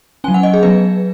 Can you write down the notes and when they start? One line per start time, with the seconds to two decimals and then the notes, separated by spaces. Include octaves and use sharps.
0.24 C#4 G#5
0.28 F#3
0.34 F#5
0.43 D#5
0.54 G#4
0.63 F#3 B3 B4